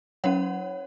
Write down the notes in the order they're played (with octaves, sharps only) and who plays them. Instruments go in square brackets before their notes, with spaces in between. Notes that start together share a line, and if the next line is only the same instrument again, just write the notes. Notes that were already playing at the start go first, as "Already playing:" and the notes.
[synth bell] F#3 C#4 C#5 F#5